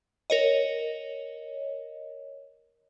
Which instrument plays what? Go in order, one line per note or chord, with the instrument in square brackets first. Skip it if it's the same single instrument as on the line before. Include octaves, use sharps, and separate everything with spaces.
[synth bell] A#4 C#5 D#5